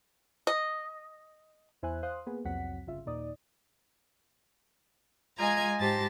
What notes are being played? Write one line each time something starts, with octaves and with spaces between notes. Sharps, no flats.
D#5
E2 E4 C5 E5 G#5 F#6
C5 F5 C6 D#6 F#6
A#3 B3 G#4 B4
C2 F2 F#3 C4 F#5 B6
G1 C#3 F4 E5
D#2 A#2 D#4 D5 D#6
G#3 F4 D#5 G#5 A#5 G#6
G#2 G4 C5 A5 A6 A#6